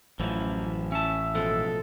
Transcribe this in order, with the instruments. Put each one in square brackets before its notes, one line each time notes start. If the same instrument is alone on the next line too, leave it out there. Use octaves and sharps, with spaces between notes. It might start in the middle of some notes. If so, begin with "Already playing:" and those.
[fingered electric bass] A1 [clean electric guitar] F#2 E3 F3
[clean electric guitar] C#4 A5 [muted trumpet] E5
[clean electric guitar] B2 F3 G#3 [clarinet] A4